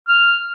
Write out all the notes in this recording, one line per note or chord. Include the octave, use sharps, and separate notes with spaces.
F6